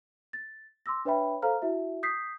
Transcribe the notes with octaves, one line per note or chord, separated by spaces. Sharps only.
A6
C6 D6 E6 A#6
D4 B4 C#5 E5 G5 B5
A4 C5 F5 A#5 F6
E4 F#4 E5
D#6 G6 B6 C7